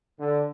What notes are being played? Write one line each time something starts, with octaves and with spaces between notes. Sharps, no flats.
D3